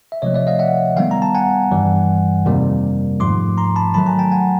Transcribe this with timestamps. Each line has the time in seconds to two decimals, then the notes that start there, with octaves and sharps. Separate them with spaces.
0.12 E5
0.22 C3 F3 A3 C#5 D#5
0.34 D5 E5
0.47 D#5 F5
0.59 E5 F#5
0.96 D#3 G3 B3 F5 G5
1.11 A#5
1.22 A5
1.35 F#5 G#5
1.72 G2 E3 G3
2.45 F2 C3 D#3 G3 A#3
3.20 G#2 F3 A3 C6 D6
3.58 A#5 C6
3.76 A5 B5
3.94 D#3 F#3 A3 A5 B5
4.06 G#5 A#5
4.19 G5 A5
4.32 F#5 G#5